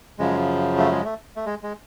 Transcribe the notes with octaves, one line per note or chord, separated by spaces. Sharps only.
F#2 C#3 F3 G#3
A3
G#3
A3
A3
G#3
G#3